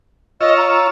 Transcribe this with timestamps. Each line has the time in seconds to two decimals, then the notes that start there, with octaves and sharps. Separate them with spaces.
0.41 F4 C#5 D#5 E6
0.57 A#5